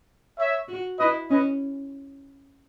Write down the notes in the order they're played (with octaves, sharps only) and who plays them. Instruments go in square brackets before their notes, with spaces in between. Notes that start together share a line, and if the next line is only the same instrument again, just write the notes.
[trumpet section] C#5 E5
[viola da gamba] F#4
[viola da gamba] E4 [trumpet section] B4 D#5
[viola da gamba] C#4 [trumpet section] B4 D#5